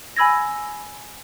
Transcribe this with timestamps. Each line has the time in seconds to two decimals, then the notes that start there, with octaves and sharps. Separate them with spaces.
0.16 G#5 B5 E6 G#6 A#6